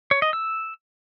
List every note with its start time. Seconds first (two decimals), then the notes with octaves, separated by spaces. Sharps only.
0.11 C#5
0.22 D#5
0.33 E6